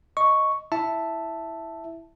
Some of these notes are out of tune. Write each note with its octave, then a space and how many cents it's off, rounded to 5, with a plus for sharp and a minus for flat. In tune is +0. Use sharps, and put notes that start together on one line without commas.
D#5 +0 C#6 +0
E4 +0 E5 +0 A5 +0